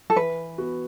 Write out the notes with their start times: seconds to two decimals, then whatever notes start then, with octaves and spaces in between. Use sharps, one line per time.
0.10 A4
0.16 E3 B4
0.58 B3 F#4